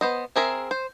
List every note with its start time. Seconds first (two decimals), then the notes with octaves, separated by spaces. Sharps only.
0.01 B3 C5 D#5
0.36 C4 G#4 A#4 E5
0.71 C5